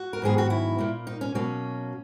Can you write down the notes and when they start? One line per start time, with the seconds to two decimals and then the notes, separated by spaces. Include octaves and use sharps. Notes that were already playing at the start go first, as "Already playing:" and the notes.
Already playing: F#4
0.13 A#4
0.22 G#2 D#3 F#3 B3 G#4
0.38 F#4
0.50 E4
0.79 A#2 A#3
1.07 D#4
1.21 C#4
1.35 B2 F#3 A#3 C#4